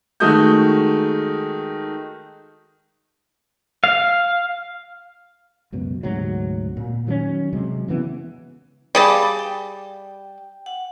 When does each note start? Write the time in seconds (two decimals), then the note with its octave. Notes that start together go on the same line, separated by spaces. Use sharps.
0.20 D#3 G#3 A3 F#4 D#6 G6
3.84 F5
5.72 C#2 F#2 B2
6.03 D2 G#2 C3 F#3
6.77 A#2
7.07 D#3 F#3 A#3 C#4
7.53 C3 F#3 G#3
7.88 C#3 E3 A3 B3
8.95 G3 G#4 F5 A5 B5 D6
9.39 G5
10.66 F#5